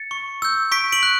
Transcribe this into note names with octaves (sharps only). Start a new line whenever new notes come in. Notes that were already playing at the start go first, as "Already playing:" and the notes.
Already playing: A6 C#7
C#6
E6 G6
C#6 B6 D7
D7 F#7
F#6